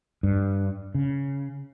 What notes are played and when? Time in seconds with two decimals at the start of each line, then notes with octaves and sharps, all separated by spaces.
0.23 G2
0.95 C#3